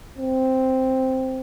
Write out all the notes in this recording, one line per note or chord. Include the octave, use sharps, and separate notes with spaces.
C4